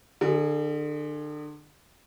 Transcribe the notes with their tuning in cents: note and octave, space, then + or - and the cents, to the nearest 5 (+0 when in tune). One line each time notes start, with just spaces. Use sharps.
D3 +35 G#4 +0